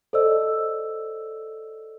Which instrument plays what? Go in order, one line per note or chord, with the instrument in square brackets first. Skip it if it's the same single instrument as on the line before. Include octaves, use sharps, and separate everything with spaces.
[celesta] A4 C5 D5 D#5 E6